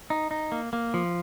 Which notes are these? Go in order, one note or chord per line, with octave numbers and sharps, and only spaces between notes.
D#4
D#4
A#3
A#3
F3